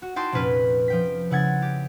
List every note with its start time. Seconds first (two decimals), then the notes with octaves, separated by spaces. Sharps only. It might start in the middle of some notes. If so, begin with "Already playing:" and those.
0.02 F#4
0.16 D#4 E4 F#4 G5 A5 C6
0.32 F1 A#2 C#4 B4 F6
0.88 F3 G5 B6
1.30 C#3 E4 F#5 G#6 A6
1.62 G4